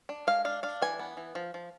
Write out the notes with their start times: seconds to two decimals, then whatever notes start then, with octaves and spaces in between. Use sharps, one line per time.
0.09 D4
0.27 G#3 F5
0.45 D4 F5
0.63 D4 F5
0.82 E3 G#5
0.99 B3
1.17 E3
1.35 F3
1.54 F3